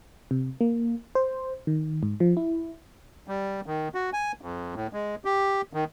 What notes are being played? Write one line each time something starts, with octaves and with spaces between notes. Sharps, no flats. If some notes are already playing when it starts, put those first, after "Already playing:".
C3
A#3
C5
D#3
G#2
F3
E4
G3
D#3
F#4
G#5
F2
A2
G#3
G4
D#3